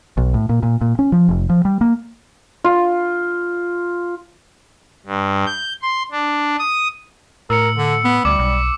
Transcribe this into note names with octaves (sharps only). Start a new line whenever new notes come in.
B1
A2
A#2
A#2
A#2
C#4
F3
F1
F3
G3
A#3
F4
G2
G6
C6
D4
D#6
A2 A#4 E6 C#7
D3
B3
D2 G3 D6
B1